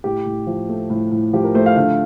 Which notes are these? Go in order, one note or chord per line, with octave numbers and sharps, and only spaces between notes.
A2 G4
A2
F3
A3
A2
A2
F3 G4
A#4
A3 C5
F5
D3 F5